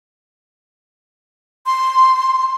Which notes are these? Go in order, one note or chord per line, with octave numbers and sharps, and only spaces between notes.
C6